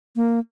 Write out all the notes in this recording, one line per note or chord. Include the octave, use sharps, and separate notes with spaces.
A#3